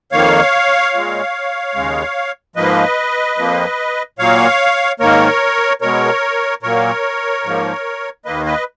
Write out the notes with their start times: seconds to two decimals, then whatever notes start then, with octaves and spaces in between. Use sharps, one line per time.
0.12 F2 D#3 A#3 C#5 F5
0.93 A#2 G#3
1.75 D#2 C#3 G#3
2.56 G#2 F3 A#3 B4 D#5
3.37 F2 F3 A#3
4.19 A#2 F#3 A#3 C#5 F5
5.00 G#2 D#3 A#3 A#4 C#5
5.81 B2 G#3 A#4 C#5
6.63 A#2 F#3 A#3 A#4 C#5
7.44 G#2 F3 A#3
8.25 D#2 D#3 A#3 B4 D#5
8.46 B4 D#5